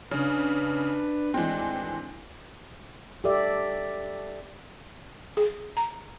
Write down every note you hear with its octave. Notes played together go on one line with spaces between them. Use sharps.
C#3 D4 B4
G#1 D2 E3 G#3 C4 D4
G4 A4 D5 E5
G#4
A#5